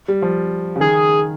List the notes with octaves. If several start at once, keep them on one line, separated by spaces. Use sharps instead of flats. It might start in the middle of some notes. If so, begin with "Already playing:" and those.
G3
F3
C#3
D#3 G#4